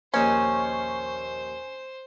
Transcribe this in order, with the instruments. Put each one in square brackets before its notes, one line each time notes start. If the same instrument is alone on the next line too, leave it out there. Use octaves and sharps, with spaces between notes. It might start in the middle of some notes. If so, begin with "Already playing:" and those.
[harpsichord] A#1 D#2 D#4 [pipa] C#4 [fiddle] C5